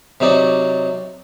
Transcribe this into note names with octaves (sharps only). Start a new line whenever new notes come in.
C3 F#3 D#4 D5